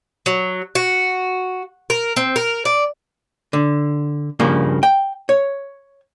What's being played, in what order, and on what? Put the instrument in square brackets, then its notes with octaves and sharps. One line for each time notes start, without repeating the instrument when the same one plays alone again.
[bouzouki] F#3
F#4
A#4
C4
A#4
D5
[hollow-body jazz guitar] D3
G2 C#3 F3 A#3
G5
C#5